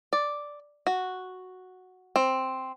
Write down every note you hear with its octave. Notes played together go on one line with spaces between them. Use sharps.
D5
F#4
C4